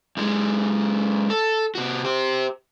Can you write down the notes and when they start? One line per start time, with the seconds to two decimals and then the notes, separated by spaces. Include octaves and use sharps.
0.17 F#2 G#3
1.30 A4
1.75 C3 F#4
2.05 G4 C5